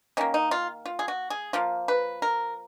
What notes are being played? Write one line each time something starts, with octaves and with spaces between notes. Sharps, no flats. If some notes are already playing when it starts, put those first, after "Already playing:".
D#3 A#3 C#4
D#4
F4
F4
G#4
F#4
G#4
F3 A#3 F4
B4
A#4